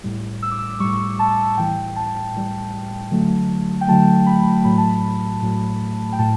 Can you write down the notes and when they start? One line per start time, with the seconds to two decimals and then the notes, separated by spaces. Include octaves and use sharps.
0.04 A2 G3
0.42 E6
0.51 D6
0.59 E6
0.80 A2 G3 C#6
1.19 A5
1.57 A2 E3 G3 G5
1.96 A5
2.34 A2 E3 G3
3.11 D3 F#3 A3
3.81 G5
3.88 D3 F#3 A3 A5
4.26 B5
4.64 A2 F#3 A3 B5
4.78 A5
4.89 B5
5.42 A2 F#3 A3
6.13 G5
6.19 A2 A5